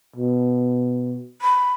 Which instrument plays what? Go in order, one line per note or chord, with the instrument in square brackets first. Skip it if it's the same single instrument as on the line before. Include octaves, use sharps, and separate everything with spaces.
[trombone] B2
[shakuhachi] B5